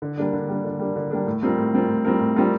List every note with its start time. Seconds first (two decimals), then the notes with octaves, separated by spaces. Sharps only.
0.02 D3
0.17 G3 A#3 D4
0.33 D3
0.48 G3 A#3 D4
0.65 D3
0.79 G3 A#3 D4
0.96 D3
1.11 G3 A#3 D4
1.27 A2
1.42 G3 C4 F4 A#4
1.58 A2
1.73 G3 C4 F4 A#4
1.88 A2
2.05 G3 C4 F4 A#4
2.20 A2
2.36 G3 C4 F4 A#4